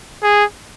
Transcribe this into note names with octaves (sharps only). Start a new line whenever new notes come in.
G#4